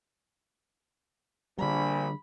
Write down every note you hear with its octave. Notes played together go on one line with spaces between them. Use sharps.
A#1 D3 G3 B5